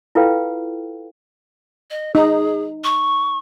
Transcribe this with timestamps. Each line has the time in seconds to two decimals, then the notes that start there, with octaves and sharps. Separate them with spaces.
0.15 E4 F4 A4 B4 F5 G5
1.91 D#5
2.15 D#4 G#4
2.84 C#6